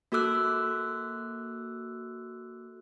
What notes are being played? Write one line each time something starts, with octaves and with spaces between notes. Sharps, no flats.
A#3 F#4 A4 D6 E6 F#6